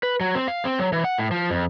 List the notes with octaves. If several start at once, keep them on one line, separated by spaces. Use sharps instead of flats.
B4
F#3
C4
F5
C4
F#3
E3
F#5
A2
F3
F2